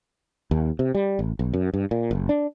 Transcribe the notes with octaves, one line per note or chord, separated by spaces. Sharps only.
D#2
C3
G3
A1
B1
F#2
G2
A#2
F#1
D4